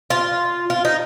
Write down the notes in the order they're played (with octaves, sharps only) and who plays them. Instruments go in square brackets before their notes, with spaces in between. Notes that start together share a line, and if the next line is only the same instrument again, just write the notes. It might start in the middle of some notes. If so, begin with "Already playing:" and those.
[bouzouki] F4
F4
D#4